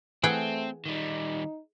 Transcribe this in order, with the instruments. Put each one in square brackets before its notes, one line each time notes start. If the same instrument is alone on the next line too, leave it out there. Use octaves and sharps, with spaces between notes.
[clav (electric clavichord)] E3 [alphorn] A3 [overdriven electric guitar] C4 [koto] G#4 F#5 G5
[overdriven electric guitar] D#3 G3 [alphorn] D#4